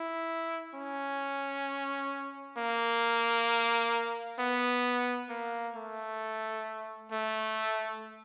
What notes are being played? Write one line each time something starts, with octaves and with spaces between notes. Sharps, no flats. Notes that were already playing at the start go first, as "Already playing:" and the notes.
Already playing: E4
C#4
A#3
B3
A#3
A3
A3